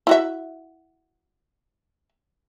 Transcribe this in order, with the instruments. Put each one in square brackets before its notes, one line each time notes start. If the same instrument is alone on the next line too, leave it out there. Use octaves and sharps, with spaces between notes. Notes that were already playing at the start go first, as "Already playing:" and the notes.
[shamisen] E4 F#4 E5